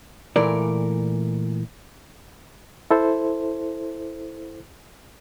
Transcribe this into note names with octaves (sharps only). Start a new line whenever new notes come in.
A#2 E3 A3 A#4 D5
E4 A4 C5